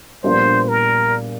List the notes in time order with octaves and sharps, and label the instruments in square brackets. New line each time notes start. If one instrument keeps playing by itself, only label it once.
[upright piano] A#1 A#2 G3 B3 D4 [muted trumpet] C5
[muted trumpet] A#4